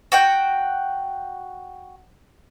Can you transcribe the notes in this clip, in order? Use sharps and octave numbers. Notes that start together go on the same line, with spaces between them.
F#4 F#5 G5